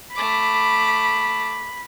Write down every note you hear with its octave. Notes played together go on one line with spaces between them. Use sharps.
A3 B5 D6